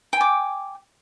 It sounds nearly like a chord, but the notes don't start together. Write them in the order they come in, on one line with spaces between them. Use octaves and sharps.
G5 G#5 D6